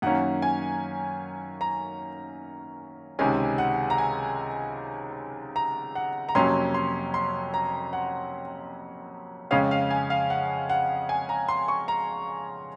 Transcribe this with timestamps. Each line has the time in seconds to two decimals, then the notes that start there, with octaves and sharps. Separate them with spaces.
0.02 F#2 D#3 A#3 C#4 F#5
0.42 G#5
1.61 A#5
3.19 C#2 C3 D#3 G#3 C#4 G#5
3.58 F#5
3.90 A#5
3.98 G#5
5.56 A#5
5.95 F#5
6.29 A#5
6.35 F2 C3 F#3 A#3 C#4 C6
6.74 C6
7.14 C6
7.54 A#5
7.93 F#5
9.51 F2 C#3 G#3 C#4 F5
9.71 F5
9.91 G#5
10.10 F5
10.30 F#5
10.70 F#5
11.09 G#5
11.29 A#5
11.48 C6
11.68 C#6
11.88 A#5